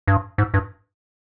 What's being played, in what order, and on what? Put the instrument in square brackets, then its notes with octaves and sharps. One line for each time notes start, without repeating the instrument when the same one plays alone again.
[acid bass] G2
G#2
G2